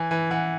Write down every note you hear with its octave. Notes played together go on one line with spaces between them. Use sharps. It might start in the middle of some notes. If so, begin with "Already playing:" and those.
Already playing: E3 G#5
E3 G#5
E3 F#5